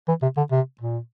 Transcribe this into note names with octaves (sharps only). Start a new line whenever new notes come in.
E3
C3
D3
C3
A#2